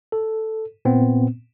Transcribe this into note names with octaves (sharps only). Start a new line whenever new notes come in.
A4
A#2 B3 C4